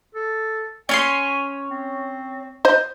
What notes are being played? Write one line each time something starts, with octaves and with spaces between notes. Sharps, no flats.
A4
C#4 C#5 G#5 C6
C4
C5 D#5